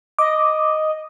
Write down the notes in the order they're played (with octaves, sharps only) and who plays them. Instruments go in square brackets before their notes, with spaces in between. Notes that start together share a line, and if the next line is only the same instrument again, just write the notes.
[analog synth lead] D#5 [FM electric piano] D6